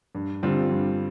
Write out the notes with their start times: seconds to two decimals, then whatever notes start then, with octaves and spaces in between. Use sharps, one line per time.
0.15 G2
0.43 D3 G3 C4 F4
0.71 G2